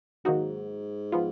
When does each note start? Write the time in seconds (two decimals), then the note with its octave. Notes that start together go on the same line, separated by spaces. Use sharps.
0.25 G#2 D#3 F#3 A#3 D#4 F#4
1.12 F3 B3 F4